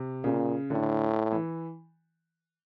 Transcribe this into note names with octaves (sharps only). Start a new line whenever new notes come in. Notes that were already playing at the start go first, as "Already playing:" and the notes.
Already playing: C3
A#2 C#3
A2 D3
E3